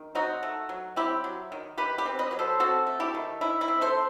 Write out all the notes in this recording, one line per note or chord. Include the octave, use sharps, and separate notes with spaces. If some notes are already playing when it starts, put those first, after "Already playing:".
Already playing: D#3
C4 D#4 F#4
A3
F#3
C4 E4 G4
F#3
D#3
D#3 G4 B4
G4 B4
C4
B4 D#5
F#3 B4
A4 C5
C4 F#4 A4
A3
E4 G4
D#3
D#3 E4
E4
C4
A4 C5